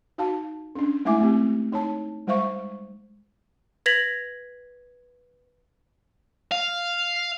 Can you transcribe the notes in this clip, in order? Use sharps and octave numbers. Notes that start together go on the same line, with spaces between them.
D#4 F#4 F5 A5
C#4 D4
G#3 A3 E4 E5 G#5 D6
A3 C4 G4
D#4 C#5 A5
G3 G#3 C5 E5 F5 C#6
B4 G#6 A#6 B6 F7 F#7
F5